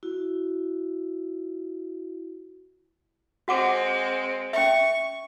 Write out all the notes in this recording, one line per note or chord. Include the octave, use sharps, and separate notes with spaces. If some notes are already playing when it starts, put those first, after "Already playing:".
E4 F#4
G#3 C4 F#4 F#5 D6
C#4 E5 C#6